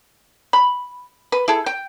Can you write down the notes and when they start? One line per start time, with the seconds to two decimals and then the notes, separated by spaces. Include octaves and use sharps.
0.53 B5
1.32 B4
1.48 E4 G#4 A4
1.66 G5